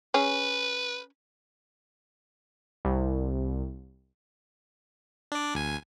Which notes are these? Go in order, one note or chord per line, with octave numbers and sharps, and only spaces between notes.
C#4 G#4 B4
C2
D4 D5
D2 G#5